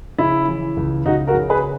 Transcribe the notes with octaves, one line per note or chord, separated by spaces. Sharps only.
C#3 E4
E3
C#2
C#2 D#4 F#4
F#4 A#4
C#3
G#4 B4